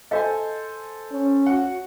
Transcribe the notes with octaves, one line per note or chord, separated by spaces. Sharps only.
A4 C5 D#5 F5 G#5
C#4
F#4 F#5